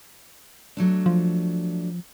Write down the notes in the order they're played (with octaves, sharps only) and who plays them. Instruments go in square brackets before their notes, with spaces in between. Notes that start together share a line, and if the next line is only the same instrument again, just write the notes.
[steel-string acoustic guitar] F#3 A3 D4
[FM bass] F3